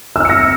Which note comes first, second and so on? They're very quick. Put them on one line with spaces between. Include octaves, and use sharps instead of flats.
E6 F6 C#7 A#6